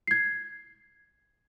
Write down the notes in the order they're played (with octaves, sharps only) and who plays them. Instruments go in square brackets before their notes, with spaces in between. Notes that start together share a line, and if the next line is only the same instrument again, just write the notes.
[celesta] G#6 C7